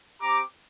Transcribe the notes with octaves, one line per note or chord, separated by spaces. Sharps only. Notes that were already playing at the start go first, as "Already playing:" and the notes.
C4 G4 A#5 D6